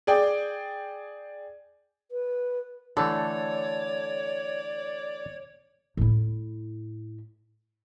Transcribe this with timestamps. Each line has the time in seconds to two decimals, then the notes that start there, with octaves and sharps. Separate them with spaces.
0.07 G#4 D5 G5
2.11 B4
2.97 D3 E3 A3 A4 C#5 D5
5.97 A2 E4